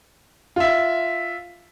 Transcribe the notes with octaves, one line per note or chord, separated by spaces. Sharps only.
F4 E5